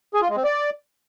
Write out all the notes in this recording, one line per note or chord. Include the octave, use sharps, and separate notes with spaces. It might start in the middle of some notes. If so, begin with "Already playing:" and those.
G#4
F4
G#3
C4
D5